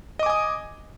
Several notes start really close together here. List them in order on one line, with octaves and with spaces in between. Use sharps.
D#5 D6 G#5 D#6